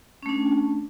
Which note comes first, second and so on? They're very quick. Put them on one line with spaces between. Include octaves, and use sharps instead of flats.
C#4 A3 D4